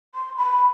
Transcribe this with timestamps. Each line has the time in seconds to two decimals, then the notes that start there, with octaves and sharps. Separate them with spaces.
0.15 C6
0.37 B5